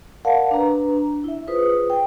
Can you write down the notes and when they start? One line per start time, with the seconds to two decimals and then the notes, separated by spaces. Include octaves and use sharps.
0.25 A#4 D5 F5 F#5 A5
0.51 D4 B4 A#5
0.91 D4
1.24 E4 E5
1.47 F4 G#4 B4 C5 D#6
1.90 G5